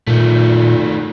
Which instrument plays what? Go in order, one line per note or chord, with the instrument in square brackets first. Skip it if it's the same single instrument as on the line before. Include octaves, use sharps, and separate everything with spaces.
[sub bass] A#2 [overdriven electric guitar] D#3 A3